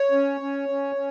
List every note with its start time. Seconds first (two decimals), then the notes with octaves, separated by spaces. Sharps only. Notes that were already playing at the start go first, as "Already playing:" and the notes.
Already playing: C#5
0.11 C#4
0.41 C#4
0.69 C#4
0.95 C#4